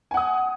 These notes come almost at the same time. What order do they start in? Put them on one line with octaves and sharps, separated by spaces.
G#5 F#5 D#6